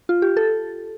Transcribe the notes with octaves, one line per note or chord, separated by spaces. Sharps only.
F4
G4
A4